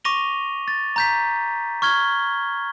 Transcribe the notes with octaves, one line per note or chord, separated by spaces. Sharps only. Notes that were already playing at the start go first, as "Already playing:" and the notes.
C#6 D6 A#6 D#7 F7 G7
A6
A#5 G6 B6
C#6 F6 G#6 G7